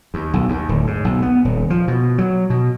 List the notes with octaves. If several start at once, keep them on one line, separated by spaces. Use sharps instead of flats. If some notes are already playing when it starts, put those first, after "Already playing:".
D#2
B1
D#2
D1
G#2
B1
B3
D#1
F3
B2
F#3
B2